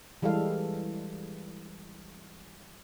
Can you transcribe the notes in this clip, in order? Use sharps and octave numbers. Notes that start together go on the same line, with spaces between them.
E3 G3 G#3 A4 F5